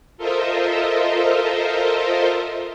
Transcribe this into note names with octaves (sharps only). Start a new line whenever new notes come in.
F4 A4 A#4 C5 D#5 E5